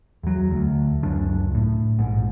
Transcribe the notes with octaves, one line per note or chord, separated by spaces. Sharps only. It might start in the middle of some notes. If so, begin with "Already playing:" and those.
E2 F#3
D2
C#2 F#2 D4
A2
A#1 G#2